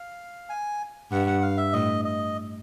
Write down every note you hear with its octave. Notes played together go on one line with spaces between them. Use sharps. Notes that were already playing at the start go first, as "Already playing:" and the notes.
Already playing: F5
G#5
G2 F#5
F#5
F5
E5
A2 D#5
D#5